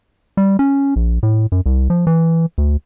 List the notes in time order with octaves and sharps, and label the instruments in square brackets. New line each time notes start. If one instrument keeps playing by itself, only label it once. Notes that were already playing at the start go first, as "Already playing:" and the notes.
[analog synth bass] G3
C#4
A#1
A2
F#2
C2
F3
E3
D2